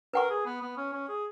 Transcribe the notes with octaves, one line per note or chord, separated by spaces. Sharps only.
A#4 B4 F#5 C#6
G#4
B3
B3
C#4
C#4
G#4